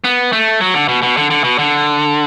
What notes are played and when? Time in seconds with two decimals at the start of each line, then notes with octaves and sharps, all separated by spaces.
0.04 B3
0.33 A3
0.61 F#3
0.74 D3
0.89 B2
1.03 B2
1.17 D3
1.30 D3
1.44 B2
1.59 D3